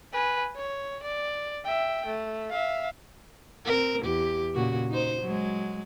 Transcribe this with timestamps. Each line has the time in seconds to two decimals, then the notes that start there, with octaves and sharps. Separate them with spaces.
0.12 B4 G#5
0.56 C#5
1.03 D5
1.64 E5 G5
2.05 A3
2.50 E5 F5
3.66 C4 A#4
4.03 E2 G4
4.54 A#2 C#3 F#4
4.90 D#4 C5
5.22 F#3 G#3